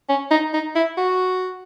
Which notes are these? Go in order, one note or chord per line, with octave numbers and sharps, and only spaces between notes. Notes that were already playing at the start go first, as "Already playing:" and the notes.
C#4
D#4
D#4
E4
F#4